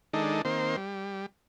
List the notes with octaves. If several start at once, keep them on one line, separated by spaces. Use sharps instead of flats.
D#3 G#3 D4 D#4 A4
D#3 A#3 C4 C5
G3